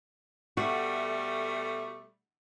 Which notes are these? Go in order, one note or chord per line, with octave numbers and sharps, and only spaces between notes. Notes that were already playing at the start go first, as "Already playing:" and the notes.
B2 G3 A3 F#4